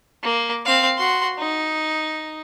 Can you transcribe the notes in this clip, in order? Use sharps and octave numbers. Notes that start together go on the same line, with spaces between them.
A#3
C4 F5
F#4 C6
D#4